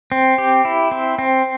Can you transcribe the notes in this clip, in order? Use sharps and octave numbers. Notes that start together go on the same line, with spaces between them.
C4
G4
E4
C4
C4